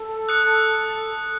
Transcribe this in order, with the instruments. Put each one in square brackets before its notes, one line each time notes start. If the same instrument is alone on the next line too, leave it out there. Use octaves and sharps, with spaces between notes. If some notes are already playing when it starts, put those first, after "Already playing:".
Already playing: [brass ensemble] A4
[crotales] D#6 F#6 C#7